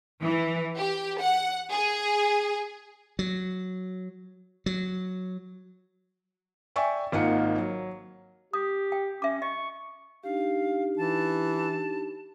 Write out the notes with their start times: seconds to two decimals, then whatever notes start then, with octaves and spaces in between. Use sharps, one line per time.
0.22 E3
0.77 G4
1.20 F#5
1.70 G#4
3.19 F#3
4.66 F#3
6.76 D5 E5 G5 G#5 C#6
7.12 G#1 A#3 D#4 F4 F#5 C#7
7.58 F#3
8.53 G4 D#6
8.92 G5
9.22 C#4 E5 D6
9.42 D#5 C#6
10.24 D4 D#4 G4 F5
10.98 E3 A5